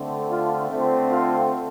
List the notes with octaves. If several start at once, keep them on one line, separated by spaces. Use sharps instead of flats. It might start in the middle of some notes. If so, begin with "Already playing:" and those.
Already playing: D3 A3 C4
D4 F4
D3 A3 C4
F4 A4